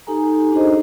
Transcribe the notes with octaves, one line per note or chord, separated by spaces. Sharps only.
D#4 G4 A4 G#5 A#5
D4 D#4 F#4 G#4 C5 D#5